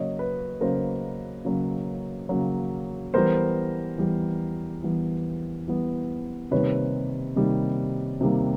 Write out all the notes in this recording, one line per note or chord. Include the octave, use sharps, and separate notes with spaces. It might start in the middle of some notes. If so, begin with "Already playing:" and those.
Already playing: C#3 F#3 A#3 C#5 D#5
B4
C#3 F#3 A#3 A#4 C5
C#3 F#3 A#3
C#3 F#3 A#3
E3 G3 B3 A#4 C5
E3 G3 B3
E3 G3 B3
E3 G3 B3
C3 D#3 G3 A#3 B4 C#5
C3 D#3 G3 A#3
C3 D#3 G3 A#3